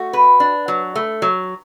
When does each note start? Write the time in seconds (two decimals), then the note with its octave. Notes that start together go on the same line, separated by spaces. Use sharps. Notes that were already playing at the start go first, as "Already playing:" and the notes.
Already playing: A3 F#4
0.13 B4
0.40 D4
0.68 F#3
0.95 A3
1.22 F#3